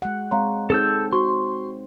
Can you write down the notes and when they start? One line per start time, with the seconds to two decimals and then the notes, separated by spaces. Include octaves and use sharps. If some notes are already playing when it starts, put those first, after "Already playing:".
0.02 G#3 F#5
0.31 G#3 C4 C#5 F5 A#5 C6
0.70 C4 D#4 G#4 A4 C5 E6 G6 E7
1.13 F#4 C5 C6 C#6